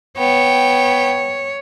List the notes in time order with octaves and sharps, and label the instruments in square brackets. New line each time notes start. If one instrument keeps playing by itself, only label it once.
[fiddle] B3 G5 [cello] C#5